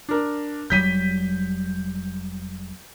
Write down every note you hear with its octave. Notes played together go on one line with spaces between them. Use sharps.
D4 A#4
F1 F#3 G3 G6 B6 D#7